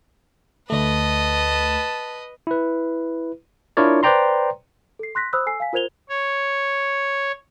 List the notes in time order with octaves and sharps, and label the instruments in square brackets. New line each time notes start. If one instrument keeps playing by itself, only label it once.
[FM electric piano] D2 A3 [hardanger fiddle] B4 D#5 [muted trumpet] A5
[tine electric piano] E4 B4
D4 E4 F4 A#4 C#5 D5
B4 C5 D5 G5 A#5 C6
[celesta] A4 C7
C6 F#6 A#6 B6
C5 B5 D#6 E6 F#6
A4 G#5 E6 C7
F5 G#5 B6
F4 A#4 C5 G#6 F7 G7
[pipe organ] C#5